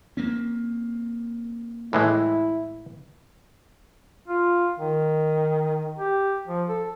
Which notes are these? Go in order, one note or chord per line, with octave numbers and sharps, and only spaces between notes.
A#3 C4 C#4
A2 E3 G#3 E4
F4
D#3
G4
F3
A4